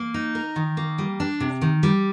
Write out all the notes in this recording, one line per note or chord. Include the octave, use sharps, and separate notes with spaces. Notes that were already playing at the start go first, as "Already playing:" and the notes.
Already playing: A#3
D#4
A#4
D#3
A#3
G3
D4
C3
D#3
G3